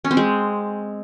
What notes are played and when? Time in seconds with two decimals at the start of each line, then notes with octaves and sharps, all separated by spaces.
0.05 C#4
0.11 C4
0.17 G#3